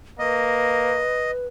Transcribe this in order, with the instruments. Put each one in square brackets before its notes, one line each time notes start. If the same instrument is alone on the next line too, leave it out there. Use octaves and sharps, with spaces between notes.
[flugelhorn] A#3 [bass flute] B4 [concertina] D#5